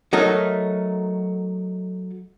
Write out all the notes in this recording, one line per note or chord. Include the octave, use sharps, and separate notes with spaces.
F#3 A3 D#4 A#4